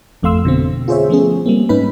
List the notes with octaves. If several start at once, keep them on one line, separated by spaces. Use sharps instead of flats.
G#1 F2 A3 F5 C6 E6
B2 D3 C4
F4 G#4 C5 C#5 E5
F3 A3 B3 C#4 G#4
G3 A#3 C4
G#2 C#4 D#4 B4 B5